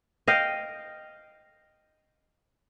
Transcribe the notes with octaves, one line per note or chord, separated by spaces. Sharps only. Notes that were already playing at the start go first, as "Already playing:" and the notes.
D#5 F5 G5